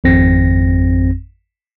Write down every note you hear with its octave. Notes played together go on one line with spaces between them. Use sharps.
G#1 F2 C4 A#6